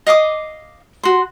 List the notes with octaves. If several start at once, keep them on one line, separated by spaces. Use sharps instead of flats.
D#5 F5 D6 D#6
F#4 C6